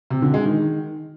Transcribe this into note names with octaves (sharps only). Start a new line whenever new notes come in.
C3
D3
G#3
D#3